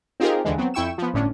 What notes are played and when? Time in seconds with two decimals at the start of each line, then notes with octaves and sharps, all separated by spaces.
0.20 C4 D#4 F4 G4 G#4 A#4
0.45 D#2 D3 E3 G#3
0.57 F#3 B3 C4
0.74 F2 E4 G5 C#6 E6 E7
0.98 F3 B3
1.14 G1 A2 C#4 D4